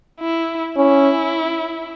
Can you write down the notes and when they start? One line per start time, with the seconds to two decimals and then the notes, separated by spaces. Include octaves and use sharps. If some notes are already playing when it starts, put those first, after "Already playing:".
0.20 E4
0.76 C#4 E4